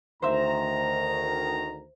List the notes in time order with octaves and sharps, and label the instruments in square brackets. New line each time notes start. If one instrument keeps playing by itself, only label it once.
[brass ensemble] D2 D#3 A#5 [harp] C5 E5